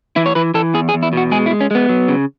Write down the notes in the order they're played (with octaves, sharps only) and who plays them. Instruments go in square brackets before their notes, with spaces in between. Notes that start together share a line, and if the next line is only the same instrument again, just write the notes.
[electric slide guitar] E3 E4
C#5
E3 B4
E3 A4
E2 G#4
G#4
E2
E4
B2 F#4
G#3 G#4
E4
G#3
C#4
G#3 B3
F#3
C#3